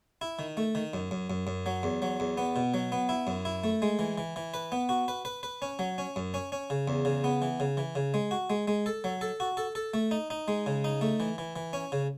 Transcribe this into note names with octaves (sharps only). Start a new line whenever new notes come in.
E4
D#3
A3
D#3
F#2
F#2
F#2
F#2
F#3
E2
F#3
E2
B3
B2
F#3
B3
E4
F#2
E4
A3
G#3
E3
E3
E3
B4
B3
F#4
B4
B4
B4
C#4
F#3
C#4
F#2
C#4
C#4
C#3
E2
C#3
B3
E3
C#3
E3
C#3
G#3
F#4
G#3
G#3
A4
F#3
A4
F#4
A4
A4
A3
D#4
D#4
G#3
C#3
D#4
A3
E3
E3
E3
C#4
C#3